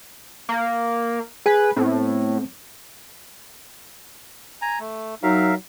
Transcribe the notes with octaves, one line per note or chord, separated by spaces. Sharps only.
A#3
G#4 B4 G#5
A2 B3 C4
G#5 A#5
A3
F#3 D#4 A#4 E5 F5